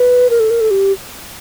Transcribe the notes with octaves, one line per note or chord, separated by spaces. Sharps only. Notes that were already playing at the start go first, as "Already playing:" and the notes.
Already playing: B4
A#4
A4
A#4
A4
G4